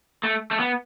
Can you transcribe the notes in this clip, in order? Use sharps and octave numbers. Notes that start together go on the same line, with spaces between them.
A3
A3
B3